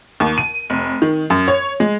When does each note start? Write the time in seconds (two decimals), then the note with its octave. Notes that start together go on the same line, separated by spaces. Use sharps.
0.20 D#2
0.38 D#7
0.70 F1
1.02 D#3
1.30 F#2
1.48 C#5
1.80 G#3